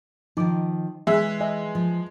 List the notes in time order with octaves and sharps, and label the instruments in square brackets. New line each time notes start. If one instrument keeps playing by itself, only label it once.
[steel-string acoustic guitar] D#3 F3 [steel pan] D#4 D6
[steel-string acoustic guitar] E3 [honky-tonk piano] G#3 [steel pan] E5
[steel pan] D#5 E5 G#5
[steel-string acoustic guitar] F3